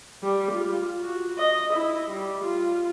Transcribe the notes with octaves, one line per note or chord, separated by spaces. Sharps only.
G3
F4
F#4
D#5
E4
G3
F4